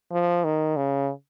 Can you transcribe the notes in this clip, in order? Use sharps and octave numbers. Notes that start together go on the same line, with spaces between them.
F3
D#3
C#3